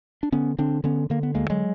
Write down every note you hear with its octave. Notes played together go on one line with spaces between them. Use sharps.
D4
D3 B3 C#4
D3 C4 D4
D3 B3 C#4
D3 A#3
B3
D2 G#3 A#3
F#3 G#3